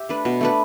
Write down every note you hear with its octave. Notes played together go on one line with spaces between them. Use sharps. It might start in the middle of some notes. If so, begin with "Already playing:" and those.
Already playing: G4 E5
A3 D4 B4
B2
A3 D4 B4